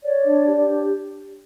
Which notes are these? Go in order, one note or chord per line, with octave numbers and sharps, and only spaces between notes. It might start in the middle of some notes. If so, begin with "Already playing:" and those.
C#5 D5
D4
G4